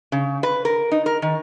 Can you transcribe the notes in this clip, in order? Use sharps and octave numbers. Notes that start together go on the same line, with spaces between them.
C#3
B4
A#4
D#4
A#4
D#3